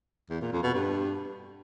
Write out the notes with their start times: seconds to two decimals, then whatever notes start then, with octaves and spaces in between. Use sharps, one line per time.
0.30 E2
0.41 A#2
0.52 F2
0.63 B2
0.74 G2